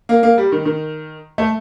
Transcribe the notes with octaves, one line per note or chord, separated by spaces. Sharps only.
A#3
A#3
G3
D#3
D#3
A3